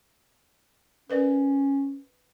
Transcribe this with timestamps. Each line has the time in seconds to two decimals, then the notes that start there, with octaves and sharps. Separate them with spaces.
1.10 C#4 A#4 B4 D5